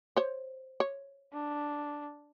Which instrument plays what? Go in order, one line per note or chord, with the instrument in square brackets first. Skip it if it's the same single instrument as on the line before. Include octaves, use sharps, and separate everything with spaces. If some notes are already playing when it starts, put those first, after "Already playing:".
[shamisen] C5 C#5
C#5
[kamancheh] D4